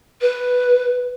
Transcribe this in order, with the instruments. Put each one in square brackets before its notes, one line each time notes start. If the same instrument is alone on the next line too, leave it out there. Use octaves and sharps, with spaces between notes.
[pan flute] B4